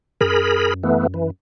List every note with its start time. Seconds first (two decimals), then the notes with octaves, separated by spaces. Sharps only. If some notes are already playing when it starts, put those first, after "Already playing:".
0.21 F#2 G#4 A#4 B5
0.83 E3 A3 B3
1.14 E3